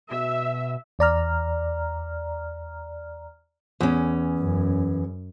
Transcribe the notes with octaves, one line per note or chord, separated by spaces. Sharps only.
B2 E5
E2 D5 A#5 F6
E2 C#4
F#2